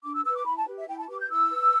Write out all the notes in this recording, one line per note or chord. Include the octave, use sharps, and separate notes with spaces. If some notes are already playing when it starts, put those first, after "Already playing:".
D4 D6
E6
B4 E6
D6
E4 B5
A5
G4 B4
E5
E4 G5
A5
G4 B4 D6
G6
E4 E6
B4